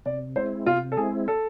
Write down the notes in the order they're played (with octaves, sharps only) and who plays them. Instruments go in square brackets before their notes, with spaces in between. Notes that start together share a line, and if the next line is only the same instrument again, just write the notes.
[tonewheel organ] C3 [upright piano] D5
[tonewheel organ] G#3 C4 E4 [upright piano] C5
[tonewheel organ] C3 [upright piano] F4
[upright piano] A4
[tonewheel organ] G#3 C4 E4 [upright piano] G#4
[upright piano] A4